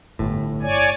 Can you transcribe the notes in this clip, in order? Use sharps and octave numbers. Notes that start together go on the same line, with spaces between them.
G1 A2
C#5 D5 G#5